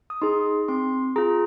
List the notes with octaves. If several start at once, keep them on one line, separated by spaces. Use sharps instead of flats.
D#6
D#4 G#4 C6
C4 C6
F4 G#4 A#5